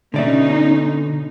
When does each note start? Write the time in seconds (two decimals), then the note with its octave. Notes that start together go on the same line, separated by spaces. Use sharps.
0.14 B2 D3 C#4 D#4 D5 E5